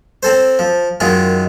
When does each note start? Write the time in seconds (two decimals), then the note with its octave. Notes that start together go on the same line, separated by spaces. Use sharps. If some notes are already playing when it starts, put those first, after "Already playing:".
0.23 C4 A4 C5
0.59 F3
1.00 F#2 D#3 G#3 F4